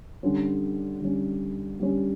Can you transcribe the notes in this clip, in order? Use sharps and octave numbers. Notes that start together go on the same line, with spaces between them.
D3 G3 C#4
D3 G3 C#4
D3 G3 C#4